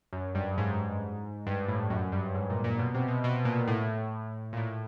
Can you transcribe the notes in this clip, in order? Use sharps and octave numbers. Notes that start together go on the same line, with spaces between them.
F#2
G2
G#2
G2
A2
F#2
G2
G#2
A#2
A#2
B2
C3
B2
B2
A#2
A2
A#2
A2